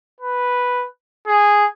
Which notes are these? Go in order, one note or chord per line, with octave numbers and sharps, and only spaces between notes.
B4
G#4